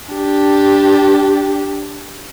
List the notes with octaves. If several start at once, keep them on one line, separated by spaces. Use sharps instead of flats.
D4 G4